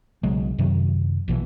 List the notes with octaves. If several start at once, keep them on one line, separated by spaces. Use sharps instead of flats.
B1 C#3 F#3 G#3
F#2 C3 D#3 F#3
A#1 B2 E3